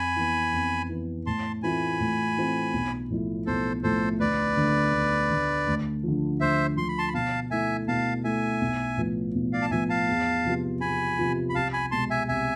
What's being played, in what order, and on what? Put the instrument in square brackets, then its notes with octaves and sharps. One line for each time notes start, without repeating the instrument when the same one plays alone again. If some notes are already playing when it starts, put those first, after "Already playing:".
Already playing: [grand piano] F2 [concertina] G#5 B5
[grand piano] E3 B3
F2
E3 B3
[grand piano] A2 [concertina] A5 C6
[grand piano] E3 A3 C4 F4 [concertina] G#5 B5
[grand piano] A2
E3 A3 C4 F4
B1
A2 F3 A3 E4
[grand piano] B1 [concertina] A4 C5
[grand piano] A2 F3 A3 E4 [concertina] A4 C5
[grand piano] D2 [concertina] B4 D5
[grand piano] D3 A3
D2
D3 A3
D2
D3 F3
[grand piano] D2 [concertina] C5 E5
[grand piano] D3 F3 [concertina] C6
[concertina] B5
A5 C6
B5
[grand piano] B2 [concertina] F5 A5
[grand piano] A3 E4 [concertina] E5 G#5
[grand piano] B2 [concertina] F5 A5
[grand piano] A3 E4 [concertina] E5 G#5
[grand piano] B1
A2 F3 B3
B1
[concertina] D5 F5
A5
[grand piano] A2 F3 B3 [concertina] E5 G#5
[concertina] F5 A5
[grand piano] E2
C3 F3 B3 F4
[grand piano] E2 [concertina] G#5 B5
[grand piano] C3 F3 B3 F4
[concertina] B5
[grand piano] C2 [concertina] F5 A5
[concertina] G#5 B5
[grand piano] B2 G#3 [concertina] A5 C6
[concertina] E5 G#5
[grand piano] C2 [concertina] E5 G#5